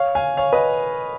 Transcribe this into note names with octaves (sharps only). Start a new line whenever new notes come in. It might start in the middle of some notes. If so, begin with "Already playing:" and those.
Already playing: C#5 F5
F5 G#5
C#5 F5
B4 D#5